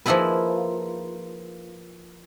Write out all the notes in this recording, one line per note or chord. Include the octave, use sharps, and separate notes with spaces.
F3 A#3 D#4 E4 G#4 B4